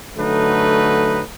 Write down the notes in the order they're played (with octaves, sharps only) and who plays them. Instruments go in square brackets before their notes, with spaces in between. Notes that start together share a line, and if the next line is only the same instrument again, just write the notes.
[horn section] D3 F#3 A3 D#4 B4